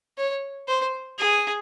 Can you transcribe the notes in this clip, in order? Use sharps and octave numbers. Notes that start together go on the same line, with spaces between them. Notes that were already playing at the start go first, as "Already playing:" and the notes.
C#5
C5
G#4